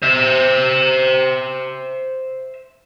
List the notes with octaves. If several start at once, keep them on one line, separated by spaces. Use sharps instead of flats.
C5 E5